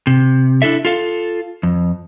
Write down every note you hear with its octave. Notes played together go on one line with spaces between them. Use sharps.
C3
D4 E4 A4 E5
F4 A4 F5
F2